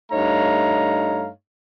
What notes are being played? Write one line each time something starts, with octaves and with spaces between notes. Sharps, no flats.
G2 A3 D#4 C#5 F5 A#5